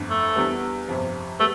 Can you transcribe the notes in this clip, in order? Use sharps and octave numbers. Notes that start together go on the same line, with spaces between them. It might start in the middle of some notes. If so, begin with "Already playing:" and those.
Already playing: G1 F2 D3
A3
E2 D3 G3 B3
G1 F2 C3 F3
G3 A3 B3